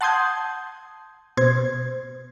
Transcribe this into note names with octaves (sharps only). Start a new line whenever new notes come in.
F#5 A5 C6 D#6 G6 G#6
B2 C5 G#6